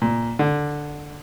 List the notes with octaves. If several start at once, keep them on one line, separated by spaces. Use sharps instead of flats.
A#2
D3